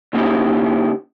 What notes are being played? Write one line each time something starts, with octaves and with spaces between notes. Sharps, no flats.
C#3 A#3 C#4 D#4 E4 G4